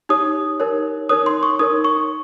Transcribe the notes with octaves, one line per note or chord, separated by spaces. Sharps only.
D#4 G4 C#5 D#6
D#4 A#4 C#5
D#4 A#4 C#5 D#6
C6
C#6
D#4 A#4 C#5 D#6
C#6